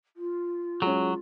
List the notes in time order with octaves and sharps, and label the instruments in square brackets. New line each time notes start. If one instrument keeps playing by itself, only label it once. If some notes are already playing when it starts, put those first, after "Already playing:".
[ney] F4
[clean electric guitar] F#3 [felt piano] G#3 C#4